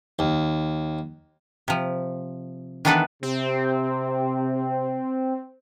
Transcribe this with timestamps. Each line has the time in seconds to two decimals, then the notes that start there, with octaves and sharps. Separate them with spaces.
0.19 D#2
1.68 C3 F3
2.85 D#3 E3 B3 D4 A4 B4
3.23 C3 C4